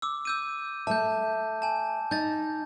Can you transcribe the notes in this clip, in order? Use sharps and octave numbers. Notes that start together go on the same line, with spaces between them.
D6 E6
E6 G6 D#7
A3 E5 A5 G6
G#5 A5
D#4 G6 A6